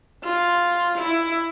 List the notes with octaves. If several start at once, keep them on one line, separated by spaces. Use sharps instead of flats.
F4
E4